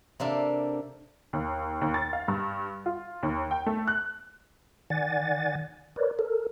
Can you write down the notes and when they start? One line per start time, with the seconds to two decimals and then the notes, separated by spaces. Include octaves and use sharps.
0.20 C3 A#3 D4 A4
1.33 D#2
1.81 D#2
1.94 A6
2.13 F5
2.28 G2
2.86 F4
3.23 D#2
3.51 G5
3.66 A3
3.87 F#6
4.90 D#3 D5 F#5 G#5 A6
5.96 A#4 B4 C#5 D5
6.19 A4 A#4